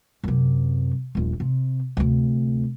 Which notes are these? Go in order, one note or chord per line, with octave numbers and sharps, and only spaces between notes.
F#2 C3
D#1 A#1
C3
D2 C3